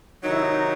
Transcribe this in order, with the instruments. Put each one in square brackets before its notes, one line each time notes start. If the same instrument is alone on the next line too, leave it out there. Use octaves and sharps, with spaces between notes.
[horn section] C3 D#3 F#3 [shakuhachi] D#4
[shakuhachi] E4
D#4